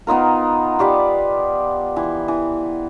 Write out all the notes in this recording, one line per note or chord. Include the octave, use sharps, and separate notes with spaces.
B3 D#4 F4 A#4
F4 G4 D5 B5
E3
E3